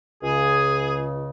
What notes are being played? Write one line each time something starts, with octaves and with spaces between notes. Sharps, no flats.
C#2 C#3 G#4